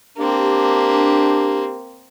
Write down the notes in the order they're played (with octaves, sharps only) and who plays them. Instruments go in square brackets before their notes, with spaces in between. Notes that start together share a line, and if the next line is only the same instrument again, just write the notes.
[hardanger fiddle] A#3 C4 [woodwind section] D4 G4